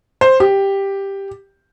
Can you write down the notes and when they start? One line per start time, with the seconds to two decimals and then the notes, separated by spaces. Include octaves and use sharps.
0.21 C5
0.40 G4